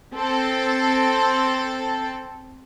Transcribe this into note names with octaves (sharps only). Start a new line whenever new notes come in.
C4 A4